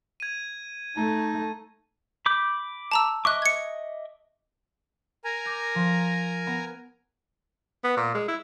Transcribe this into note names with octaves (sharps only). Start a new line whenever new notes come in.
G#6 D#7
A3 D#4 A5
B5 D6 G6
A5 A#5 E6
D#5 E5 C#6 D6 F#6
G#6 C#7
A#4 G#5 A#5
D6 G6
F3
B3
B3
A#2
G#3
E4